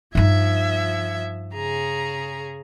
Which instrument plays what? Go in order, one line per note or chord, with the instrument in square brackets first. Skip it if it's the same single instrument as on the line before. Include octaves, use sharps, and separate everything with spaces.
[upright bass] G2 D#4 [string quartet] F3 E5 G#6
[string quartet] C#3 G#4 A#5